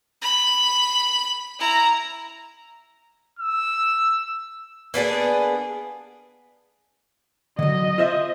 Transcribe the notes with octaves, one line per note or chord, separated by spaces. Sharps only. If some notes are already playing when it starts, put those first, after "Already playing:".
B5
E4 A#5
E6
A#3 B3 D4 G#4
D3 F#3 D#5
F4 C5 E5